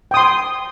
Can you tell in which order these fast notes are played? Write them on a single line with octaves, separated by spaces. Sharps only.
G5 D#6 C6